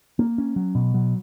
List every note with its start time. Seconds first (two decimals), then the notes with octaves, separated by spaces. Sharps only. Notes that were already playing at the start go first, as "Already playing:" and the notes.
0.19 A#3
0.38 C#4
0.56 F#3
0.75 B2
0.94 F#3